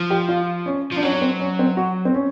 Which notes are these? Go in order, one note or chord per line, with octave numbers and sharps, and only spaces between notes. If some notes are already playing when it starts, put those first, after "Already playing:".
Already playing: F3
G4
F4
C#4
F3 D4
F#3 C#4
C#4
C4
C#4
C4
F#4
C4
C#4